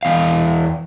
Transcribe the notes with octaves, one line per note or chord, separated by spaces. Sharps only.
E2 F5